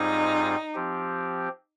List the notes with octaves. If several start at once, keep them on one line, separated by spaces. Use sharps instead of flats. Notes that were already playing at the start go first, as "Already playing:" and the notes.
Already playing: G#2 G3 C4 D#4 F4 G#4
F3 C4 G4